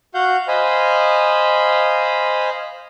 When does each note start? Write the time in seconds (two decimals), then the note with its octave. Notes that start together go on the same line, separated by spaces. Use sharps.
0.14 F#4 F5 F#5 G6
0.48 C5 D#5 F5 G#5 B5